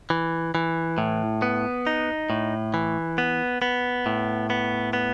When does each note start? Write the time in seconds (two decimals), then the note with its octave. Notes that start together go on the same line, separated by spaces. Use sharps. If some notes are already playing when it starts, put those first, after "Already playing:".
0.10 E3
0.55 E3
0.98 A2
1.42 B3
1.87 D#4
2.30 A2
2.74 E3
3.18 B3
3.62 B3
4.06 A2
4.50 B3
4.93 B3